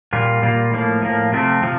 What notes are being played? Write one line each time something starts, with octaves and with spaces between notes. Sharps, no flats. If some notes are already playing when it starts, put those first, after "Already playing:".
A#2 G3 A#3 F4
A#2 G3 A#3 F4
A2 F3 A#3
A2 F3 A#3
C3 F3 A3 C4
C3 F3